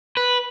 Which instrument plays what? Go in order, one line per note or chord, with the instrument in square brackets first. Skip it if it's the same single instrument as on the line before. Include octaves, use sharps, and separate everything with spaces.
[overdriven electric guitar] B4